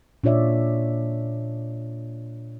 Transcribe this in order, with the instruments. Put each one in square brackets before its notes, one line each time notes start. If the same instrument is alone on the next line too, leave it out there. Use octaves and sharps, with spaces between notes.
[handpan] A#2 D4 F4 C#5 D5 E5